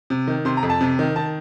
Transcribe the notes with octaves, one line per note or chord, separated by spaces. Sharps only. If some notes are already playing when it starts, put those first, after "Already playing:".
C3
D#3
C3 C6
A#5
F2
A5
C3
D#3
D#3 A5